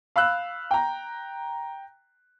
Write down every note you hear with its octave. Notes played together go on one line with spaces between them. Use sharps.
F5 B5 E6 F#6
G5 A#5